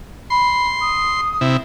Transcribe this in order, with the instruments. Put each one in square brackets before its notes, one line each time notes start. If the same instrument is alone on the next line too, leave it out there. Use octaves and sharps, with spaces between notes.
[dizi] B5 [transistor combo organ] C6
[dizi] D#6
[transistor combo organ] C3 E4